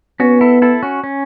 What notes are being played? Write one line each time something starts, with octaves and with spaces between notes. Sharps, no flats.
B3 C#4 F#4
E4 A4
E4 A4
C#4 F#4
C#4